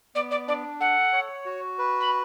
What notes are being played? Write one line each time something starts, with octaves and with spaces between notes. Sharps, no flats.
B3 D5
D5
D4 D5
A4 F#5
C#5
F#4
B4
B5